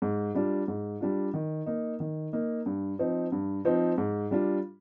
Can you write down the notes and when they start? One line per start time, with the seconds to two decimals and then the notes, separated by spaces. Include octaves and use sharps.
0.02 G#2
0.35 G3 D4 F4
0.68 G#2
1.01 G3 D4 F4
1.34 D#3
1.66 A#3 D#4
2.00 D#3
2.33 A#3 D#4
2.66 G2
2.99 F3 C4 D#4
3.32 G2
3.65 F3 C4 D#4
3.98 G#2
4.31 G3 D4 F4